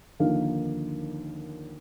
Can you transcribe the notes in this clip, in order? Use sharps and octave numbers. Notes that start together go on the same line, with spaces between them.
D#2 D3 F3 A#3 D#4 F5